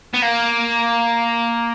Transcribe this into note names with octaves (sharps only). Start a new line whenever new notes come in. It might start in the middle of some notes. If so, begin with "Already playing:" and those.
B3
A#3